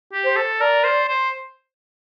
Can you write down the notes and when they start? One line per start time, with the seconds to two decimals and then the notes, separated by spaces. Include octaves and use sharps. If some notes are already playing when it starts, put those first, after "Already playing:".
0.13 G4
0.24 C5
0.36 A4
0.60 A#4 D5
0.84 C5
1.09 C5